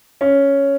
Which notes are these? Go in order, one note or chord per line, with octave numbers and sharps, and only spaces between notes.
C#4